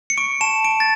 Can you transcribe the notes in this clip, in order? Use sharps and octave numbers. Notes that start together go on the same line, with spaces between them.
C#7
C#6 D7
A5 E7
A5 D7
A6